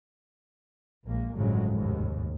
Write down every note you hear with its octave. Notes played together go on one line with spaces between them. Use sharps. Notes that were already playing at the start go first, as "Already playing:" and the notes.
A#1 G#3 A#3
G1 A2 C#3 F3 F#3 G#3
F1 D#2 G#2